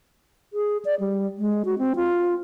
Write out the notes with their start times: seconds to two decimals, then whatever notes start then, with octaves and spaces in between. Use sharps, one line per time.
0.53 G#4
0.85 D5
1.00 G3
1.38 G#3
1.65 F#4
1.78 C4
1.96 F4